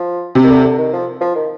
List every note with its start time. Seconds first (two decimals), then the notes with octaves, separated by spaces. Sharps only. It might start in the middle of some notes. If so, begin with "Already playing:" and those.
Already playing: F3
0.35 C3
0.43 D#3
0.50 D3
0.64 D3
0.78 D#3
0.93 F3
1.21 F3
1.35 D#3